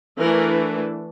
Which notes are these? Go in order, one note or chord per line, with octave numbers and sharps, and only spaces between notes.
E3 A3 D4 A#4